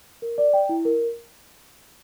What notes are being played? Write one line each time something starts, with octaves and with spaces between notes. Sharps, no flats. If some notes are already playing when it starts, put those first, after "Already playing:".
A#4
D5
G5
E4
A#4